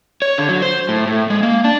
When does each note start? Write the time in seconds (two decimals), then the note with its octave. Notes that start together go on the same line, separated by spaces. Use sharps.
0.22 C#5
0.38 D3
0.49 F#3
0.62 C5
0.89 A2
1.07 A2
1.30 G#3
1.43 A#3
1.64 D4